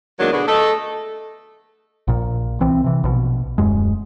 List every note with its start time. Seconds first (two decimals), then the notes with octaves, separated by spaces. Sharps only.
0.20 E2 D#3 F#3 G#3 A#3 D4
0.32 B2 D3 F#4 G#4 B4 D5
0.47 A3 A4 D#5
2.08 A#1 A#2
2.60 C2 E3 C4
2.84 C3 E3
3.04 A#1 B2
3.58 D#1 F#2 G#3